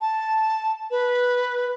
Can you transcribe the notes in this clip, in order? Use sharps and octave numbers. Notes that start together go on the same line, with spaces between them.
A5
B4